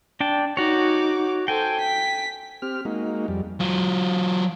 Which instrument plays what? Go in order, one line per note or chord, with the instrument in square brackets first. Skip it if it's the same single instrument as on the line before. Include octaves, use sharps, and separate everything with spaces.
[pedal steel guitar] D4 G5 A5
[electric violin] D#4 D6 [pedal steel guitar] F#4 C#5
[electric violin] A4 C5 [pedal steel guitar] G5 G#5
[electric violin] B6
[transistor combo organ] C4 G4 F6
G#3 A#3 D#4 F#4
F2 G3
[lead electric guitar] F#3 F4